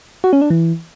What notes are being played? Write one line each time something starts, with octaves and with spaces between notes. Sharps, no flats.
F#4
C#4
D4
E3